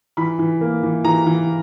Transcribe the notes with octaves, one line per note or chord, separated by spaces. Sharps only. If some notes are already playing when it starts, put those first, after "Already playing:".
E3 B5
E3
A#3
E3
E3 A#5
E3